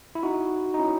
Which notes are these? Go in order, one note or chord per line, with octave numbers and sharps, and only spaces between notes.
E4
D#4 F#4
D#4
C#4 E4